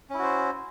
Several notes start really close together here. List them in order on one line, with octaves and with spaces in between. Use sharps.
C#4 E4 F#4 C5